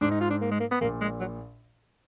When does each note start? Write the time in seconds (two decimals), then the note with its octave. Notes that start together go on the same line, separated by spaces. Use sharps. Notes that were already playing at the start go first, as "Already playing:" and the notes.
0.01 G#2 D4
0.11 D#4
0.20 F4
0.30 D4
0.42 A#3
0.51 G#3
0.60 A#3
0.71 B3
0.81 A#1 A#2 A#3
1.01 G#3
1.20 F#3